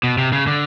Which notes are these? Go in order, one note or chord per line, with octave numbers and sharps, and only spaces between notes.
B2
C3
C#3
D3